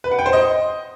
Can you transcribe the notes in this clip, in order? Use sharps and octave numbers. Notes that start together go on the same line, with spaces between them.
B4
F#5
G5
C5
D#5